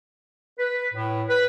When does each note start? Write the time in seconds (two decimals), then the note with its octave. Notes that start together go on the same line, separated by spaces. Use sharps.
0.59 B4
0.93 A2
1.28 B4